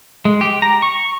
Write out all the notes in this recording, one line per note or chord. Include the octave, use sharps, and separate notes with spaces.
G#3
G4
A#5
C#6